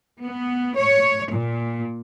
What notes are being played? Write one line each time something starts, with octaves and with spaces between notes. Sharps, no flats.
B3
C#5
A#2